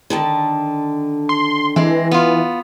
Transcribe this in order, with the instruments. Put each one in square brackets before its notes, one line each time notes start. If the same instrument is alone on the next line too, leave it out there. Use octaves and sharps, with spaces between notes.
[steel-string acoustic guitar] D3 D#3 A5
[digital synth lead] C6
[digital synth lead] E3 [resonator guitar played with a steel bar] G#3 C4
[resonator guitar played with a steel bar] B3 F4